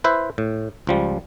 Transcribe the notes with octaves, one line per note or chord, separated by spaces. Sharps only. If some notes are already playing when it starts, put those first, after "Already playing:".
E4 B4 C5 E5
A2
C#2 F3 G3